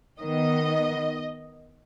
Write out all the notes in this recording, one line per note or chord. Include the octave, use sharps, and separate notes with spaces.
D#3 B3 D#5